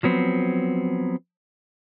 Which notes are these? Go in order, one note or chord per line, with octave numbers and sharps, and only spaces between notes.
F3 F#3 B3 C4